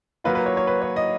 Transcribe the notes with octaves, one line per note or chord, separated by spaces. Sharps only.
F#3 A#3 F4 B4
B4
C#5
C#5
B4
C#5
D#5